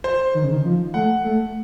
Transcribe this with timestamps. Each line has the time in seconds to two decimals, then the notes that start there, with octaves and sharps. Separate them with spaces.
0.04 C5
0.35 D#3
0.44 C#3
0.53 D#3
0.65 F3
0.94 A3 F#5
1.24 A3